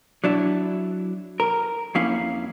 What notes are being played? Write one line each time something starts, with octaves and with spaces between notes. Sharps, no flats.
F#3 D4 E4
A#4
F2 A#3 C#4 E4 F5